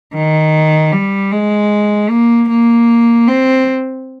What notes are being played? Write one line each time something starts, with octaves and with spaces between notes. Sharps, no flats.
D#3
G3
G#3
A#3
A#3
C4